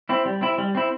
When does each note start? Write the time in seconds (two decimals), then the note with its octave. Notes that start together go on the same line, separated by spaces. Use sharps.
0.09 C4 E4
0.25 G3
0.41 C4 E4
0.58 G3
0.75 C4 E4